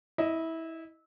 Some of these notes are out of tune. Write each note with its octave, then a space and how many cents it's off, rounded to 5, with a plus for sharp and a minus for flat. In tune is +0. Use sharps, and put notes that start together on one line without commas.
E4 -20 D#5 +0